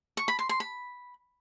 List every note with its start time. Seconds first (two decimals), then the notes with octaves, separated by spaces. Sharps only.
0.17 C#6
0.28 B5
0.39 C6
0.49 C6
0.60 B5